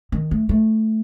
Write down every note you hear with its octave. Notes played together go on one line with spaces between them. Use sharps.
D#3
A3
A3